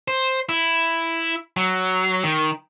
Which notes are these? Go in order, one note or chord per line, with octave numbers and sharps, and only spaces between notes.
C5
E4
F#3
D#3